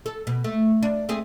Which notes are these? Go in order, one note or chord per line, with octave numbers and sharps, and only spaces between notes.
A4
B2
A3
D4
A3 C4 G#4